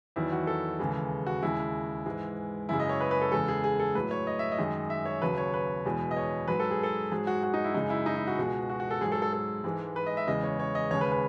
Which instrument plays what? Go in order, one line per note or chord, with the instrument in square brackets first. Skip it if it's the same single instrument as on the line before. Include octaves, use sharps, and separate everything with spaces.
[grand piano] E2 D#3 F#3 E4
F#4
A4
D#2 C#3 E3 G#3
F#4
D#2 C#3 G#3 E4
G#2 E3 G#3
F#2 C#3 G#3 E4
D#5
C#5
B4
B4
A4
E2 C#3 G#3 A4
G#4
G#4
A4
A2 F#3 B4
C#5
D#5
E5
D#5
F#2 D#3 G#3
E5
C#5
D#2 C#3 F#3 B4
C#5
B4
E2 B2 G#3
D#5
C#5
G#2 F#3 B4
A4
G#4
A4
G#2 F#3 G#4
F#4
F#4
D#4
E4
F#2 C#3 G#3 D#4
E4
D#4
E4
F#4
C#2 B2 G#3
F#4
F#4
A4
G#2 G#4
F#3
A4
A4
A4
G#2 E3 G#3
B4
D#5
E5
E2 C#3 E3 G#3 D#5
C#5
C#5
D#5
D#2 C#3 G#3 C#5
B4
B4